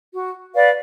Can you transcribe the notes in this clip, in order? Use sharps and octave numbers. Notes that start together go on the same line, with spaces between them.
F#4
B4 D5 F5